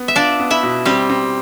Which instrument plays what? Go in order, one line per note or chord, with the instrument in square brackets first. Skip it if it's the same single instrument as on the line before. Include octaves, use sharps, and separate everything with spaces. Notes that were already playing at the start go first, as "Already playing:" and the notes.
Already playing: [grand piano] B3
[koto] E5
[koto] D4 D5 [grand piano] F4
[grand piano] B3
[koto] E4 E5
[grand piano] B2
[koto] G3 G4 [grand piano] C4
[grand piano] C4